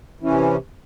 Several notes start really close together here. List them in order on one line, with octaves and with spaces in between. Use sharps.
E3 C#4 C3